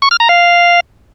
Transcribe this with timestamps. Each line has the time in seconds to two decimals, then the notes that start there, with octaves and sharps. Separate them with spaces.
0.02 C#6
0.11 F6
0.20 A#5
0.29 F5